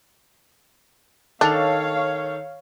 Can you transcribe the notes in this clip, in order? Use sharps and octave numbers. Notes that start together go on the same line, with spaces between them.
D#3 D4 A4 C#5 F5 F7